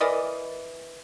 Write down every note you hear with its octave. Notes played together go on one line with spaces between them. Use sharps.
E3 A#4 D5 D#5